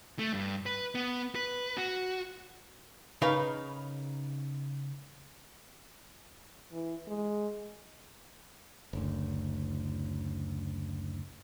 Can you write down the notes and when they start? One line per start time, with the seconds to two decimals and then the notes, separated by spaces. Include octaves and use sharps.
0.19 A3
0.33 G2
0.66 B4
0.95 B3
1.35 B4
1.77 F#4
3.22 C#3 D#4 A#4 B4 F5
6.72 E3
7.08 G#3
8.93 F#1 D2